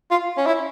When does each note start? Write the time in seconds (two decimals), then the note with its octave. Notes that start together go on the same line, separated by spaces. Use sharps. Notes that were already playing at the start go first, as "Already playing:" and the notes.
0.11 F4
0.37 C#4
0.46 E4